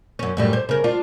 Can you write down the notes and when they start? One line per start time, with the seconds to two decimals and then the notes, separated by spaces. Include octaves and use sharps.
0.19 F#2 C#4
0.37 F#2 A2 G3
0.53 C5
0.69 C#3 A#4
0.84 D4 F4